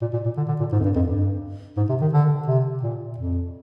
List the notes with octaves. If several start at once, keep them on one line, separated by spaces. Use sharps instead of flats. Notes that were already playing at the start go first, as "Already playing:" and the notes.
A#2
A#2
A#2
D3
D3
A#2
G#2
F2
G2
F2
G2
G#2
C3
D#3
D3
C3
A#2
F2